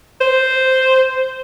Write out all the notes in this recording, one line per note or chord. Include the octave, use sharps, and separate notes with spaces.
C5